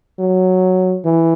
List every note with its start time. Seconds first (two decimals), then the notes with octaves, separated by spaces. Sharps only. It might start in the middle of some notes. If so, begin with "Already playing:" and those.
0.19 F#3
1.05 E3